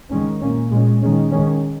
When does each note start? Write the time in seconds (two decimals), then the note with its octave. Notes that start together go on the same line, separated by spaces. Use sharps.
0.11 D#3 G#3 C#4
0.41 A#2 A#3 C#4
0.71 A#2 G#3 C#4
1.02 D#3 G#3 C#4
1.32 D#3 G#3 C#4